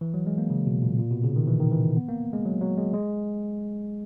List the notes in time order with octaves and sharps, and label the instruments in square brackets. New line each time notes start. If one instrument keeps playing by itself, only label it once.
[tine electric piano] E3
F#3
G#3
A#3
C#3
B2
A#2
A#2
B2
C#3
D#3
E3
D#3
E3
B3
A#3
G#3
F#3
F#3
G#3
G#3